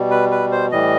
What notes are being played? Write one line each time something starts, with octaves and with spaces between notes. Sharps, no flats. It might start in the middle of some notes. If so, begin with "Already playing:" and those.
Already playing: B2 G3
B4
B4
C5
A2 E3 G3 D#5